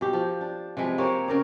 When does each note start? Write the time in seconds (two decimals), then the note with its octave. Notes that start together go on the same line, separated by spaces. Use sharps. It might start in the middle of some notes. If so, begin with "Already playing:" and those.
0.01 B2 G4
0.13 F3
0.41 D4
0.77 C3 F3 G#3 B4
0.98 A#3 C4 G4 C#5
1.28 C#3 A#4 D5